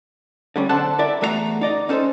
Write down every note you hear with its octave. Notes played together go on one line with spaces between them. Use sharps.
D3 G3 C#4
B1 D3 A4 C5 F#5 A5
E4 A#4 D5 E5
E2 A3 F#4 G#4 A#5
D#4 D5 D#5
C#4 D#4 A4 A#4 C5